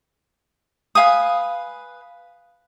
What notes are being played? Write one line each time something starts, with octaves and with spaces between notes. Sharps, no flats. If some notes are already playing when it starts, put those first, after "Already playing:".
B4 F5 G#5 D#6